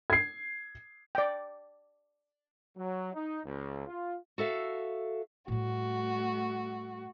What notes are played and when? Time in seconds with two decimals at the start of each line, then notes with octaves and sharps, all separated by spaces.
0.10 G#6 C7
1.15 D5 G5
2.76 F#3
3.14 D#4
3.45 C#2
3.87 F4
4.38 F#4 A4 E5 F5
5.48 A2 G3 A3 F#4